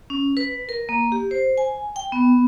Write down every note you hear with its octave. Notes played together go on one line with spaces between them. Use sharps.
C#4
B4
A#4
A#3
G4
C5
G#5
G5
B3